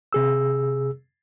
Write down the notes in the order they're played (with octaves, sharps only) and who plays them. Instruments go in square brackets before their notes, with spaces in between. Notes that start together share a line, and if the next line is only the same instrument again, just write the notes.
[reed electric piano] C3 G#4 E6